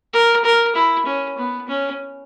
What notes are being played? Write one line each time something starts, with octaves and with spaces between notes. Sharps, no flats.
A#4
A#4
E4
C#4
B3
C#4